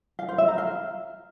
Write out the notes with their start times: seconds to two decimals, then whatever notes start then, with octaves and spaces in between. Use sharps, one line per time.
0.19 F5
0.29 C5
0.38 E5
0.48 A#5
0.58 F5